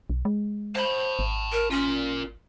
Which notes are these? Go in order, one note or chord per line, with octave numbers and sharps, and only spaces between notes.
B1
G#3
C5 A5 B5
G#1
A#4
C#4 F4 A#4